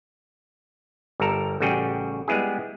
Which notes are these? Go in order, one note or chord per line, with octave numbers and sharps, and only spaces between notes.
G1 G3 A4 A#4 A#5
A1 C#3 G3 F#4 G#4 G5
G3 G#3 B3 E4 G#4